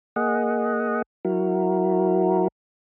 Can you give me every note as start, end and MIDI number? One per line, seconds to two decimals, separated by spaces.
0.16 1.02 58
0.16 1.02 68
0.16 1.02 75
0.16 1.02 78
1.25 2.48 54
1.25 2.48 64
1.25 2.48 66
1.25 2.48 70